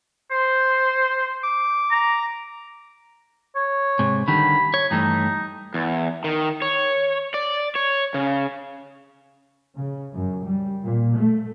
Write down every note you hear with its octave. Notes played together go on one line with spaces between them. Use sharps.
C5
D6
A#5
C#5
G#2 C3
D3 D#3 G3 B5
C#5
G2 E3 A3 D#4
E2
D#3
C#5
D5
C#5
C#3
C#3
F#2
G3
A#2
A3